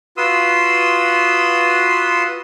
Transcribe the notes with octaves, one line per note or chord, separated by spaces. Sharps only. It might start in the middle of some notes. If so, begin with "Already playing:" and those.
F4 F#4 B4 C6 D#6 E6